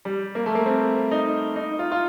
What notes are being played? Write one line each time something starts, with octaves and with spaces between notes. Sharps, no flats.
G3
A#3
A3
A#3
C4
D#4
D#4
F4
F4